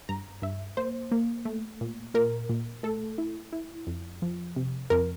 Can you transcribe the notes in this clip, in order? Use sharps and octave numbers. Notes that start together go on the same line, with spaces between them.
G2 A#5
G2 E5
A#3 C5
A#3
A3
A#2
A#2 A#4
A#2
A3 A4
E4
E4
F2
F3
C3
F2 A#4